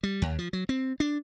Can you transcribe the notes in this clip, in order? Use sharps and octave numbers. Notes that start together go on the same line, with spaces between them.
G3
D#2
F3
F#3
C4
D4